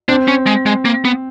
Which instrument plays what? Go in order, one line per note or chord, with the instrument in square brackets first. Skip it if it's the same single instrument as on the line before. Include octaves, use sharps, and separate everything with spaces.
[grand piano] C4 [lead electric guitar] D4
[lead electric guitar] C#4
G#3
G#3
A#3
B3